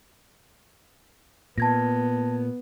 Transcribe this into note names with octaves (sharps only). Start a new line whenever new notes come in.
A#2 B3 A5 G#6 A#6